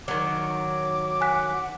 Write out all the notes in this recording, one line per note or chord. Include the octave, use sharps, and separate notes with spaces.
D#3 F#3 D6
F#5 G#5 F#6 B6